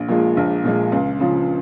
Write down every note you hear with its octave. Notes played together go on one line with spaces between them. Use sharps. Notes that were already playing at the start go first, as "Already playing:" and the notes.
Already playing: A#1
A#2 F3 G#3
A#1
A#2 F3 G#3
C#2
C#3 F3